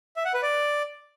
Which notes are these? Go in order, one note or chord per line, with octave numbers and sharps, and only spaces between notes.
E5
F#5
B4
D5